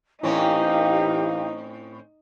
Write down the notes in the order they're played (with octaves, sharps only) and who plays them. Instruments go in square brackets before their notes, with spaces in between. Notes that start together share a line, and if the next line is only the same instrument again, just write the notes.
[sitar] A2 C4 C#4 [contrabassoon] E3 [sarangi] D#4 [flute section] G4 A#4 F5